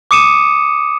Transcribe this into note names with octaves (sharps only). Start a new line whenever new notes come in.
D6 D#6 C#7 D#7 E7